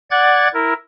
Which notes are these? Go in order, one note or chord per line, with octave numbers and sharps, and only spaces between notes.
D5 F#5 F#6 G#6 A6
E4 A#4